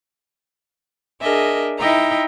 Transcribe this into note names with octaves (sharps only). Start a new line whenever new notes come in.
D4 G#4 A#4 D#5 E5
D#4 E4 D#5 E5 G5 A#5